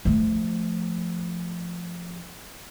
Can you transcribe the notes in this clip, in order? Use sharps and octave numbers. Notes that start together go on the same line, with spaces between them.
F3 A3